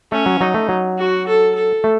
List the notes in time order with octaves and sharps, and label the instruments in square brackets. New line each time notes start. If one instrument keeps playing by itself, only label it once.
[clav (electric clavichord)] A3 [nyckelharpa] C#4
[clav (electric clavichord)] F#3
[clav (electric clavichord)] F#3 [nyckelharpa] D#4
[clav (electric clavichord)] A3
F#3
[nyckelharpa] F#4
A4
A4
[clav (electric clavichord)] A3